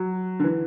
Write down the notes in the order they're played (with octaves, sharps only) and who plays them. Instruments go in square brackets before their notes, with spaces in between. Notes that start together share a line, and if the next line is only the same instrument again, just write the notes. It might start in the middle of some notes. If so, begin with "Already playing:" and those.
Already playing: [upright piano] F#3
D3
E3